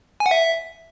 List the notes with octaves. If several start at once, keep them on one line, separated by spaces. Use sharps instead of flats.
G#5
F#5
E5